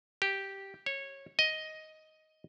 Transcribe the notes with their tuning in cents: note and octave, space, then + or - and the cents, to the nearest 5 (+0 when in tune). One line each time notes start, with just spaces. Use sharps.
G4 -5
C#5 -15
D#5 +10